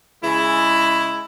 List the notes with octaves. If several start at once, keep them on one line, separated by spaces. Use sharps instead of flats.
C#3 G#3 E4